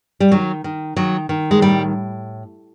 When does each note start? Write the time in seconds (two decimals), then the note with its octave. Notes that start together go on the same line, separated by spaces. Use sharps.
0.20 G3
0.32 D#3 F#3
0.64 D#3
0.96 D#3 F#3
1.29 D#3
1.51 G#3
1.61 A2 G3